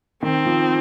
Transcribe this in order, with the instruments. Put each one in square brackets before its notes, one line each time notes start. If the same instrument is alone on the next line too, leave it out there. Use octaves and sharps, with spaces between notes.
[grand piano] D#3 [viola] C4
[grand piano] F3